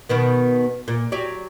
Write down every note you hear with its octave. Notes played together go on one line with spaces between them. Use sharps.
B2 D#3 B3
A#2
F#3 G4 D5